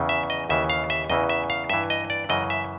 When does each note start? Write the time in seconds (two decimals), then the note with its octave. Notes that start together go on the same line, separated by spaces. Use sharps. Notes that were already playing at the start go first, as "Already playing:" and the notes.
Already playing: E2 C#3 E3
0.09 E5
0.30 D#5
0.49 D#2 C#3 E3 E5
0.70 F5
0.90 E5
1.10 E2 C#3 E3 D#5
1.29 E5
1.50 F5
1.70 G2 E3 E5
1.90 D#5
2.10 D5
2.29 F#2 C#3 E3 D#5
2.50 E5